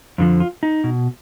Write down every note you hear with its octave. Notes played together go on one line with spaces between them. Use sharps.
F2 D3 F3
F4
D#4
B2